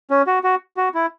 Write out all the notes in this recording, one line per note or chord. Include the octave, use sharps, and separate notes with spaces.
C#4
F#4
F#4
F#4
E4